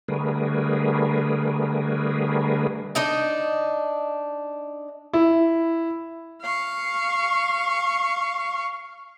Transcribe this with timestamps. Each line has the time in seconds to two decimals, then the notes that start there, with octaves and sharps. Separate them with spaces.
0.08 D3 G3 A3 G#4 A#4 B4
2.95 D4 D#4 D#5
5.13 E4
6.42 F5 C#6